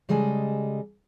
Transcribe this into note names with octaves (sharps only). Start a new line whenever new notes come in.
C#3 G3 G#3 A4 D#5 G#5